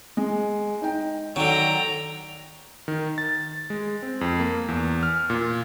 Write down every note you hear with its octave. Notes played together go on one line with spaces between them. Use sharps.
G#3
D#4 G5
D3 D#3 F#3 G5 A#5
D#3
A6
G#3
C4
F2
A#3
E2
F6
A#2